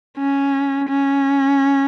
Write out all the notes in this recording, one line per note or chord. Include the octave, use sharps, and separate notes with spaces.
C#4
C#4